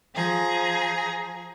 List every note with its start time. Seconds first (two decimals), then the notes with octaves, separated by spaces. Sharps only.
0.14 F3 G#4 A#5